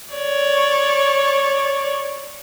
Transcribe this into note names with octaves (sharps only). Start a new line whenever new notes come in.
C#5 D5